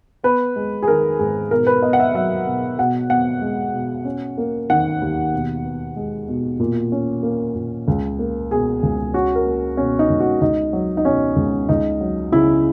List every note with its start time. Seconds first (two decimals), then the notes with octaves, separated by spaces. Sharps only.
0.23 B3 B4
0.56 G#3
0.83 G#4
0.88 D#3 A#4
1.19 G#2 G#4
1.51 B2 A#4
1.67 B4
1.82 B3 D#5
1.93 F#5
2.00 E5
2.15 F#3 E5
2.46 B2
2.78 B2 F#5
3.10 B3 F#5
3.41 G#3
3.74 B2
4.05 C#4
4.38 A#3
4.70 D#3 F#5
5.02 D#2
5.33 B2
5.65 B3
5.96 G#3
6.28 B2
6.60 A#2
6.92 C#4
7.23 A#3
7.56 A#2
7.88 C#2
8.19 A#3
8.51 B2 G#4
8.83 C#2
9.14 C#4 F#4
9.35 A#4
9.46 A#3
9.77 B2 C#4
9.99 D#4
10.10 C#2
10.20 F#4
10.41 C#2 D#4
10.73 F#3
10.97 D#4
11.04 B2 C#4
11.36 C#2
11.69 C#2 D#4
12.00 F#3
12.32 C#3 E4